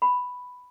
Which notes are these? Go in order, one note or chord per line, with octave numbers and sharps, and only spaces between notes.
B5